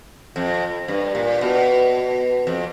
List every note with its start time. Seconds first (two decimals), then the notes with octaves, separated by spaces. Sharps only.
0.36 F2
0.88 G2
1.15 A#2
1.41 B2
2.47 F2